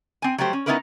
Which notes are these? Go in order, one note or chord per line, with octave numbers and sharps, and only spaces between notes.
C4 G#5
F#3 G3 A3 G4 C5
C#4
B3 C#4 D#4 E4 A#4 B4